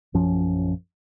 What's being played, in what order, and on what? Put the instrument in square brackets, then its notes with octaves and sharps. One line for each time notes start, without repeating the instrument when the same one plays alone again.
[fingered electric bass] A#1 F#2 F3 C#4